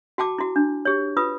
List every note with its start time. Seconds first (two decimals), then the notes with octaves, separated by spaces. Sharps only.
0.18 F#4 G5 A5 D6
0.38 E4 F#4
0.56 D4
0.85 G4 C#5
1.17 F4 B4 D#6